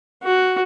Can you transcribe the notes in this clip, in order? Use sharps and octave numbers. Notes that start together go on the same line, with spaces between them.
F#4